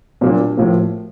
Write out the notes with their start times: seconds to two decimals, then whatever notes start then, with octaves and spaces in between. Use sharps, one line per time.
0.21 A#2 F#3 A#3 D4
0.57 A2 F3 A#3